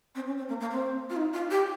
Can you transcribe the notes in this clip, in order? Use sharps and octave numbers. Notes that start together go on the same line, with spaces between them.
C4
C#4
C4
A#3
A#3
C4
F4
D#4
F4
G4